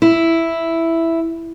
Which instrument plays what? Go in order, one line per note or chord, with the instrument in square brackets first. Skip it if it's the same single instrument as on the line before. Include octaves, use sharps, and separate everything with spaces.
[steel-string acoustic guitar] E4